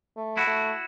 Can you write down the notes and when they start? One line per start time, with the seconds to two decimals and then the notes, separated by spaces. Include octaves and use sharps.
0.17 A3
0.37 E4 F#4
0.47 A3